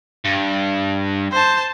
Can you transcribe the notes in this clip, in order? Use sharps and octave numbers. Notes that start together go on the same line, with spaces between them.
G2
C5 A5